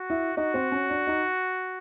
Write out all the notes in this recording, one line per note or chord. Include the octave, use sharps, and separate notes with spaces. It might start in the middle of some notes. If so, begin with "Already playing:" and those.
Already playing: F#4
E4 E5
D#4 F#4 D#5
C4 C5
C#4 C#5
D4 D5
D#4 D#5